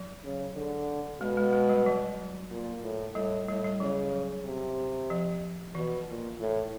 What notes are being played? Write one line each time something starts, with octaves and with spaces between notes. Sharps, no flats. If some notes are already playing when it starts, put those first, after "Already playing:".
Already playing: F#3
C#3
D3
B2 G#3
G#3
G#3
G3
F#3
A#2
A2
A2 G3
A2 G3
G3
C#3 F#3
C3
F3
B2 E3
A#2
A2